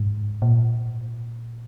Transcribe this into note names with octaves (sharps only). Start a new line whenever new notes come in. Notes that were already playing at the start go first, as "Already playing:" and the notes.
Already playing: G#2
A#2